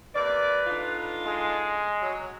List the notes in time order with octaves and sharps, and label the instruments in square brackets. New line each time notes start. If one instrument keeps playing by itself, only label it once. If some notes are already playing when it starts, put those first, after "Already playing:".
[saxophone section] C3 A#3 D5 [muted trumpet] B4
[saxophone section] D3 D#4 F4
[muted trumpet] G#3
[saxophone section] F#3